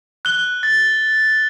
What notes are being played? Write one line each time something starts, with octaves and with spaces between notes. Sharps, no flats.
F#6 G7
A6